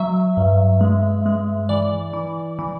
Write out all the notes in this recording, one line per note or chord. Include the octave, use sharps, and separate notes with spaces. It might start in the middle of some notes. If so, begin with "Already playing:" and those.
Already playing: F#3 E5
G2
G#3
G#3
E3 D5
E3
E3